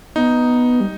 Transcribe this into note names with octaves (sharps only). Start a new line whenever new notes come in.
B3 D#4
G3